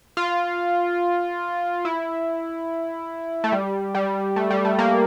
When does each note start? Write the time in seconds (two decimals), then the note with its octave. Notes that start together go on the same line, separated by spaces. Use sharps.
0.17 F4
1.85 E4
3.44 A3
3.52 G3
3.95 G3
4.36 A3
4.50 G3
4.65 A3
4.79 A#3